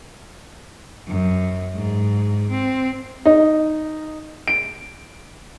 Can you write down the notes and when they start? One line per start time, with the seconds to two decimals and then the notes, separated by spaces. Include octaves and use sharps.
1.07 F#2
1.74 G#2
2.49 C4
3.25 D#4
4.48 D7